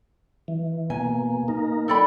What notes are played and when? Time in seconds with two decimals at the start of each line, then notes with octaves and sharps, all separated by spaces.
0.48 E3
0.90 B2 A#3 G#5
1.48 A#3 D#4 A#4
1.88 A4 D5 G5 B5 C#6